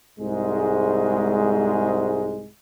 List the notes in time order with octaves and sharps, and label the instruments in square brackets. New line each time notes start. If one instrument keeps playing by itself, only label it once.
[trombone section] C2 G#2 G#3